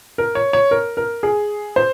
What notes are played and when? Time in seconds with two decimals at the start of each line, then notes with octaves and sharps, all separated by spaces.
0.18 A#4
0.35 C#5
0.53 C#5
0.71 A#4
0.97 A#4
1.23 G#4
1.76 C5